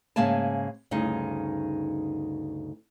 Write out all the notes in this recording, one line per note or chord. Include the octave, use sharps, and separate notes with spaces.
G#2 C#3 A#3 E5 G#5 A5
D2 G2 C#3 D#4